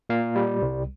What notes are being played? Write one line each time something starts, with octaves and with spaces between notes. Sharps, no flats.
A#2 F5
G3
C2